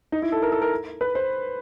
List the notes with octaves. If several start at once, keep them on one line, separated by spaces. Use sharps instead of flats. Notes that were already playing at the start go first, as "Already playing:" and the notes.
D#4
E4
A4
A#4
A4
A#4
B4
C5